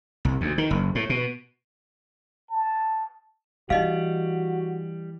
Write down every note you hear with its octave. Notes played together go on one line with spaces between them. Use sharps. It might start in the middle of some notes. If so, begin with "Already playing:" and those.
C2
D2
D#3
F#1
A2
B2
A5
E3 G3 D#4 F#4 D#5 F5